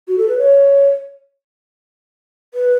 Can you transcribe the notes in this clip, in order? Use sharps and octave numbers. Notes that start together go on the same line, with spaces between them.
F#4
A4
B4
C#5
B4